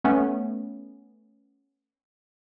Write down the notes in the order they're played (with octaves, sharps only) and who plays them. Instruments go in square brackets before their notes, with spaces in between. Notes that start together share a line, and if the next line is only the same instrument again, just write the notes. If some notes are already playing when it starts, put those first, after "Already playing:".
[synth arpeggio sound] A3 B3 C#4